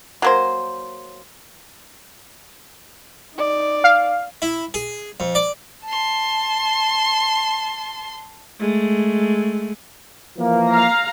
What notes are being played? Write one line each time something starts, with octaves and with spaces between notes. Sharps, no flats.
F#3 A#3 C5
D#4 D5
F5
E4
G#4
F2
D5
A5 C6
G#3 A3
E3 F3 A#3
F5 A#5